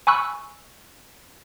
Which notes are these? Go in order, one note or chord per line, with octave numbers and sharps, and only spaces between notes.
G#5 B5 C#6 E6 F#6